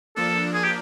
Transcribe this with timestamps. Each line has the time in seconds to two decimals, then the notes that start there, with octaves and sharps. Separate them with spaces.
0.16 F3 A#3 D4 A4
0.54 G#4
0.64 G4